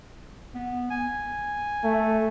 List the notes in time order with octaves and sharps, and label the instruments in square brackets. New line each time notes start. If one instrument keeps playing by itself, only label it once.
[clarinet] B3
G#5
[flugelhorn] A3